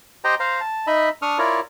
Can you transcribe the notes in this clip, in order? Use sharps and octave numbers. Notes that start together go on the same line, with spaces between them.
G4 C5 D#5 G5 A#5
C5 F5 A#5
A5
D#4 D#5 E5 B5
D4 C#6 D#6 F6
E4 F4 A#4 C#5 D5